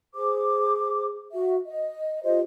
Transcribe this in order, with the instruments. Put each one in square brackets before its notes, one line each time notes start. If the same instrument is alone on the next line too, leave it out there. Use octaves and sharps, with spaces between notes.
[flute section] G#4 C5 D6
F#4 E5
D#5
F4 G4 C5 D#5